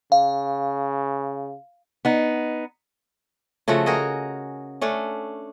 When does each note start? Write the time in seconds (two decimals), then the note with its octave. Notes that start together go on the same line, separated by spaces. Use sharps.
0.12 C#3 F5
2.05 B3 D#4
3.68 C#3 F3 A3 F#4
3.86 F#4 G#4 A#4 D#5
4.81 A3 C#4 D4